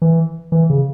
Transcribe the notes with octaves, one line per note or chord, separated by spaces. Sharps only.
E3
E3
C#3